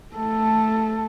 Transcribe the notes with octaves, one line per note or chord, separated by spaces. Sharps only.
A3 A4